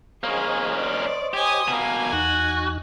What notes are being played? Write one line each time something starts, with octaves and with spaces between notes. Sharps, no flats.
A#3 C#4 G#4 C5 C#5 D#5
D5
G4 G#5 D#6
B2 A#3 G#5
E2 D#4 F#4 F#6